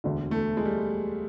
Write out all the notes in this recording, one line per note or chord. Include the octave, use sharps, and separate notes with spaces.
E1 D2 D3
A3
G#3
G3